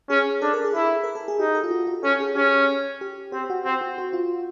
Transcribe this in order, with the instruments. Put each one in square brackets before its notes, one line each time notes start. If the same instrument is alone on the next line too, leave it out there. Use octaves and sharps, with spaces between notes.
[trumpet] C#4 [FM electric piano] G#4
[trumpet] D4 [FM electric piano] A4
[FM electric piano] A#4
G#4
[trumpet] E4 [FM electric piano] G#4
[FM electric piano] A#4
A4
G#4
[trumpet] D#4 [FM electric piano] G4
[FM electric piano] A4
F4
F#4
F#4
[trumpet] C#4 [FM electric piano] A4
[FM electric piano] G#4
[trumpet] C#4 [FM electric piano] G4
[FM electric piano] G4
[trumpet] C4 [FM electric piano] G4
[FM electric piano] F#4
[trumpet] C4 [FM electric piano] F#4
[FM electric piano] F#4
F#4
F4